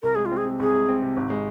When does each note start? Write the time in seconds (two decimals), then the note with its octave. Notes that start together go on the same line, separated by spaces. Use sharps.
0.03 C2 A#4
0.15 G#3 G#4
0.26 F4
0.31 C4
0.37 G#4
0.45 C3
0.60 C2 G#4
0.74 G#3
0.89 C4
1.02 C3
1.17 G#1
1.30 G#3